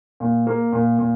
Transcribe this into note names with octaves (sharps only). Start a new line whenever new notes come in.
A#2
A#3
A#2
A#2